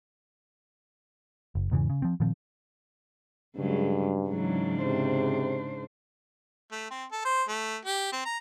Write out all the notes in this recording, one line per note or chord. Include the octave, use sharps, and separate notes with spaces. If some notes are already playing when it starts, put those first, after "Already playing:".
F#1
E2 G#2 C#3 E3
C#3
F3 C4
A#2 D#3 F3 C4
G2 C#3 F#3 G#3
G#2 C#3 E3 F#3 D4
C3 C5
A3
C4
A4
C5
A3
G4
C4
A#5